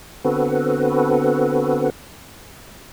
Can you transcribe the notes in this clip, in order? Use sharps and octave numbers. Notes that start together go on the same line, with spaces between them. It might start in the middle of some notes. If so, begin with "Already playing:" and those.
D3 B3 C4 F#4 A4 B4